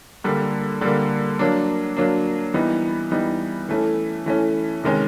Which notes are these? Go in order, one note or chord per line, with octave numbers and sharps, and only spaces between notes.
D3 G3 A#3
D3 G3 A#3
F#3 A#3 D4
F#3 A#3 D4
E3 G3 B3 D#4
E3 G3 B3 D#4
E3 A3 C#4
E3 A3 C#4
C3 D#3 G#3 C#4